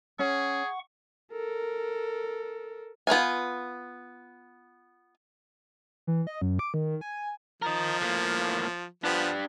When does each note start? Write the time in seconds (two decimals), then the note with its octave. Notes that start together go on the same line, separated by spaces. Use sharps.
0.19 C#4 G#4 F#5 C#6
1.32 A4 A#4
3.07 B3 F4 F5 G#5
6.07 E3
6.27 D#5
6.42 F#2
6.59 D6
6.74 D#3
7.01 G#5
7.62 F3 A#4 D#5
8.01 A2 A#3
9.04 F3 B3 D4 G4